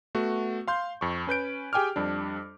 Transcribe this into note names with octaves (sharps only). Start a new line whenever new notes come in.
A3 B3 F#4
F5 C6 G6
F2 C#6
C#4 B4 G6 D7
G4 G#4 G5 G#5 D6 F6
F2 G3 D4